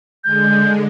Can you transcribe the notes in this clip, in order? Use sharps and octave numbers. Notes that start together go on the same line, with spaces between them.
D3 G#3 G6